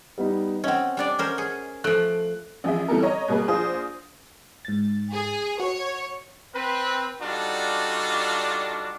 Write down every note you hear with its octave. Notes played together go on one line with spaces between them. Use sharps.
G3 B3 D#4
C4 C#4 D#5 F#5
G3 D4 D5
C#4 A#4 C5
G#4
F3 A3 F#6 D7
A1 F3 G#4 E5
E3 G3 A4 A#4
C#5 D#5 A#5
B2 G3 A#3 G#4 B4
A#1 F4 G#4 C5 D#6
G#2 A6
G#4
F#4 C#5
C4 B4
G3 D4 D#4 F4 F#4 A4